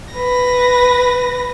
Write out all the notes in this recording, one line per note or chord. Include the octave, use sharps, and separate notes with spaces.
B4 A#6